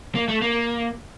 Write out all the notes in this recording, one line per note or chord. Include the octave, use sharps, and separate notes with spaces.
A#3
A3
A#3